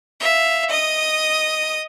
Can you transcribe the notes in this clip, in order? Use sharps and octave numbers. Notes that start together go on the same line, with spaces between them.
E5 F5
D#5 D#6